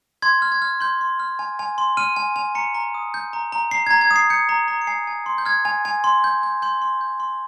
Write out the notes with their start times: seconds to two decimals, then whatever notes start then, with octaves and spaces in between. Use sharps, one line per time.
0.22 C6 G#6
0.42 F6
0.52 G#6
0.62 F6
0.81 C6 G6
1.01 C6
1.20 F6
1.39 G#5
1.59 G#5
1.78 C6
1.97 F6 D#7
2.16 G#5
2.36 G#5
2.55 A#5 C#7
2.75 A#5
2.94 D#6
3.14 G6
3.33 A#5
3.52 A#5
3.71 A#5 C7
3.87 A#5 G#6
4.01 G#6
4.11 D#6
4.16 C7
4.30 G6 C#7
4.49 A#5
4.68 A#5
4.82 C#7
4.87 G#5 C7
5.07 G#5
5.26 C6
5.38 G6
5.45 F6 G#6
5.65 G#5
5.85 G#5
6.04 C6
6.24 G6
6.43 G6
6.62 C6 G6
6.82 C6
7.01 G6
7.20 C6